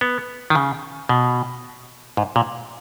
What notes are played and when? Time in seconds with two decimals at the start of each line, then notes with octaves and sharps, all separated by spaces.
0.01 B3
0.50 D#3
0.55 C#3
1.09 B2
2.17 G#2
2.36 A#2